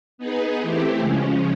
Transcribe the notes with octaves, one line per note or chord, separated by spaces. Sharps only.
B3 D#4 G#4 B4
E3 A3 C4 E4 G4
C#3 F3 G#3 C#4